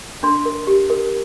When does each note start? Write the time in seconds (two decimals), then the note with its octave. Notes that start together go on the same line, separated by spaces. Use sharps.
0.23 D4 C6
0.45 A#4
0.67 G4
0.90 A#4